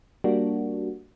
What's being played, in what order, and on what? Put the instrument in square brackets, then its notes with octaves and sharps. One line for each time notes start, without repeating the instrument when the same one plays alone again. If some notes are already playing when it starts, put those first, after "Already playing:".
[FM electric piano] G3 A#3 D4 F#4